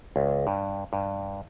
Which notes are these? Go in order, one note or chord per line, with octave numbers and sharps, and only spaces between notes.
C#2
G2
G2